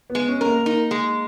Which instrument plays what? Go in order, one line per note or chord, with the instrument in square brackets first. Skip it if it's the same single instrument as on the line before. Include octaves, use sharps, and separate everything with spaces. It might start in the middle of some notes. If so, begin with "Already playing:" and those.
[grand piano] B3
[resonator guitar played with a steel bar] G#3
[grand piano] C#4
[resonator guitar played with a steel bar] A#4
[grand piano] A#3
[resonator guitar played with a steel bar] D#4
G#3